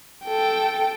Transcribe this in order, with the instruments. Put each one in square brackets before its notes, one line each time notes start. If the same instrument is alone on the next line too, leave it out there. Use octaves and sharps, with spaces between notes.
[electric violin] A4 G5